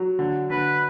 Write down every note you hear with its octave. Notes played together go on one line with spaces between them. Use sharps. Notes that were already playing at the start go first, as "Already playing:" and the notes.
Already playing: F#3
D3
D3 B4